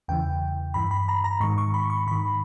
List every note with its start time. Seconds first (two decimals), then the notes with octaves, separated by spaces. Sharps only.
0.08 E2 C#3 E3 G5
0.74 G2 E3 B5
0.91 B5
1.08 A#5
1.24 A#5
1.40 G#2 D#3 C#6
1.58 C#6
1.74 B5
1.90 C#6
2.07 G#2 D#3 B5